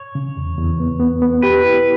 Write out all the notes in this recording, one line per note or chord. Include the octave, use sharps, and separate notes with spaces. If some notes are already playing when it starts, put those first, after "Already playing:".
Already playing: C#5
C#3
E2
E2
B3
B3
B3
G4 B4
E4